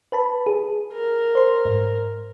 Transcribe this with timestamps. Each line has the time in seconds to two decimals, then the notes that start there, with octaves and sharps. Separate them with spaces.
0.12 B4 A5 B5
0.46 G#4
0.93 A#4
1.35 C5 C6
1.65 G#2